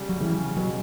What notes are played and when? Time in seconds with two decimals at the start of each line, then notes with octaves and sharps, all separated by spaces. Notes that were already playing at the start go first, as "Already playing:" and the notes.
Already playing: C#3 G3
0.09 F#3
0.21 C#3 E3
0.56 B2 F#3